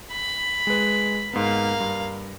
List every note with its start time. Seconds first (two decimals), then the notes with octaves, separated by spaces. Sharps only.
0.12 B5
0.67 G#3 B4
1.33 G#2 A#3 B3 F5
1.80 G2